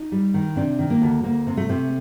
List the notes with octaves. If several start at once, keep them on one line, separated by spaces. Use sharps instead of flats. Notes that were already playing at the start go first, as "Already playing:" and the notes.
Already playing: D#4
G3
D#3
C3 D4
D#3
A#3
D2
D2 A#3
C3
A3
C3